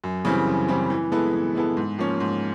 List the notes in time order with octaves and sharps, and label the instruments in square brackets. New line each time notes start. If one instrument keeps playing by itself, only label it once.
[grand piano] F#2
C#3 E3 G3 C4
F#2
C#3 E3 G3 C4
E3
G#3 B3 E4 A4
E3
G#3 B3 E4 A4
G#2
F3 A#3 C#4
G#2